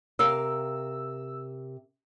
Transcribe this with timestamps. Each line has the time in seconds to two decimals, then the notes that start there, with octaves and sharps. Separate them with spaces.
0.19 C3 A#4 F5 E6